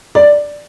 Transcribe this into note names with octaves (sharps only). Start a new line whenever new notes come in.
D5